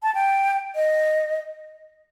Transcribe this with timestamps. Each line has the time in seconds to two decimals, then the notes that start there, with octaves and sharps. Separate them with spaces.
0.03 A5
0.15 G5
0.75 D#5